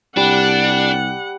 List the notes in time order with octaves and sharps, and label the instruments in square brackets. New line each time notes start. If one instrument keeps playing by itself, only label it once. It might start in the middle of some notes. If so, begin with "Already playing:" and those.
[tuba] C2 [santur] G3 [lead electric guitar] D4 [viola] F#5